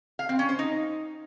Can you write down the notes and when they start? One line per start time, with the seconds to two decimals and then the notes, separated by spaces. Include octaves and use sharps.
0.19 F5
0.29 C4
0.39 C#4
0.49 C5
0.59 D#4